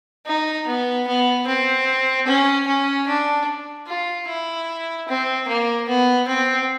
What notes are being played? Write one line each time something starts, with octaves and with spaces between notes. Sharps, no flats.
D#4
B3
B3
C4
C#4
C#4
D4
F4
E4
C4
A#3
B3
C4